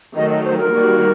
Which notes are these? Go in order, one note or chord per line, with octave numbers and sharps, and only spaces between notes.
D#3 F#3 A3 D#5
D#5
C5
A#4
D#3 G3 A#3 F#4